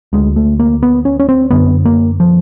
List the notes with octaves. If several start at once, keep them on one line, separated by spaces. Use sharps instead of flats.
D2 D3 G#3
A3
A#3
B3
C#4
C#4
C4
F#2 D3 B3
A#3
F3